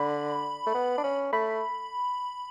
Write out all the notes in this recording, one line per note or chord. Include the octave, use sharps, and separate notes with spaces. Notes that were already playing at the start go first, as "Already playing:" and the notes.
Already playing: D3 B5
A3
B3
D4
C#4
A3 B5